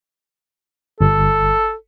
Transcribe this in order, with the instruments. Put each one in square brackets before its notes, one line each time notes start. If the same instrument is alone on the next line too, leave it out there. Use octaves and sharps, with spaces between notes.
[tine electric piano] G1 [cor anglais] A4